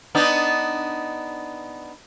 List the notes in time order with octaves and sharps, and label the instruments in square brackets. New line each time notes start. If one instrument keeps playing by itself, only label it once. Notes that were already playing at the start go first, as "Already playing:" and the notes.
[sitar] B3 D4 D#4